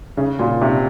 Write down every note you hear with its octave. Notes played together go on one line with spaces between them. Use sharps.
C#3
A#2
C3